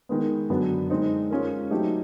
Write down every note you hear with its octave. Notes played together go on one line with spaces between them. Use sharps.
D#3 G#3 B3
F#2 D3 F#3 B3 D4
G#3 C4 D#4
G#3 C#4 F4 A#4
F#3 A3 C4 D#4 G4